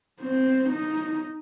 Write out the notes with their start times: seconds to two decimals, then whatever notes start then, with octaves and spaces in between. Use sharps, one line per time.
0.22 C4
0.69 D#4